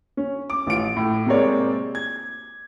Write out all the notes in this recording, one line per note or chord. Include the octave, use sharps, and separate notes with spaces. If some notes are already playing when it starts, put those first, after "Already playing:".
C#4
D6
A1 F4 D7
A2
C3 G#3 A#3 C4 C#5 D5
G#6